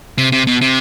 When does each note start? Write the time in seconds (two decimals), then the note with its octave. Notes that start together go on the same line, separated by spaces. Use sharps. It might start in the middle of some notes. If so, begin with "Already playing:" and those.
0.18 C3
0.32 C3
0.47 B2
0.61 C3